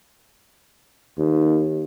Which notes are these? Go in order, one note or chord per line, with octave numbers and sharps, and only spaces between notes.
D#2